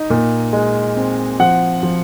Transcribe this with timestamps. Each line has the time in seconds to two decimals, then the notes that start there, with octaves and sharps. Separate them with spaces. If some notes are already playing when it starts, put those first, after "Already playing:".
Already playing: D#4
0.10 A#2
0.53 G#3
0.96 C4
1.39 F3 F#5
1.83 F3